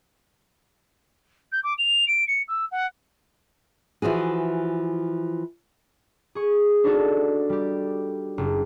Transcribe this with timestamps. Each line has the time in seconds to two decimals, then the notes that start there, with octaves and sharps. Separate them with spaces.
1.52 G6
1.63 D6
1.78 F7
2.07 D7
2.27 C#7
2.48 E6
2.71 F#5
4.02 E3 F3 F#4 G#4
6.35 G#4 C#6
6.84 D4 D#4 F#4 A4
7.49 G3 G4
8.38 F#1